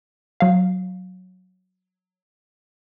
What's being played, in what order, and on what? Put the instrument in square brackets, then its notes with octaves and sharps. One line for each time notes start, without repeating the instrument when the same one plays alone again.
[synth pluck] F#3 F5